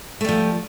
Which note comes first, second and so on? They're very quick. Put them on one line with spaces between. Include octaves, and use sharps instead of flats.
A3 G3 F3